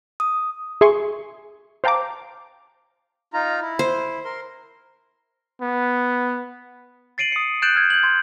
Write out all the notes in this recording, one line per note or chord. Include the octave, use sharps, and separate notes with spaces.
D#6
G#4 E5 G#5 C6 C#6
C5 F5 G5 A5 A#5 D6
D#4 F4 A#5
E4
C5
A#4 C6
B3
A6 C7 D7 D#7 F#7
D#6 C#7
F#6 G6 A6 D7 E7 F#7
F6 G#6
G6 F#7
C6 G#6